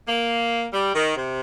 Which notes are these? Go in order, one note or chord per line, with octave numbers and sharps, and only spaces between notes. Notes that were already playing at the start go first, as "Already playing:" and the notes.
A#3
G3
D#3
C3